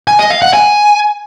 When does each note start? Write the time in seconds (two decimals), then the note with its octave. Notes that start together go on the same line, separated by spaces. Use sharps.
0.07 G#5
0.19 D#5
0.30 F5
0.42 F#5
0.53 G#5